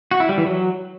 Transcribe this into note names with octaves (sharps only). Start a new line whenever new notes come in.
F#4
E4
G3
E3
F#3